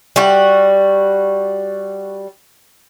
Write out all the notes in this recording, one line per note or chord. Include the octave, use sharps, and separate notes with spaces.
G3 F#4